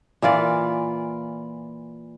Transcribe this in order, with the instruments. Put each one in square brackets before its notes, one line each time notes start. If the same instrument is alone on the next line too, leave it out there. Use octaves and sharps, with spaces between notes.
[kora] A#2 E3 F4 D5